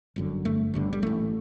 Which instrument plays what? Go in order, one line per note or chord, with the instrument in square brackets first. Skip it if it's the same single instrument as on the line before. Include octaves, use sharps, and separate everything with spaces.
[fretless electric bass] G1 F#2 D3
G1 G2 D3 A3
G1 G2 D3
G3
A1 A2 A3